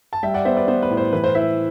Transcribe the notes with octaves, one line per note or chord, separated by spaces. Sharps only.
A5
G3 E5 G5
D5 F#5
B3 C5 E5
B4 D5
B3 C5
B4
A2
C5
E3 B4
C5
E4 C5 E5